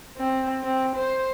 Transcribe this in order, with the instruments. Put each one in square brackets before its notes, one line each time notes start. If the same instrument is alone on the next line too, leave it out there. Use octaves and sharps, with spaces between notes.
[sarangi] C4
C4
C5